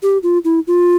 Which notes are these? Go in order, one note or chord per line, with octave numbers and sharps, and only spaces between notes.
G4
F4
E4
F4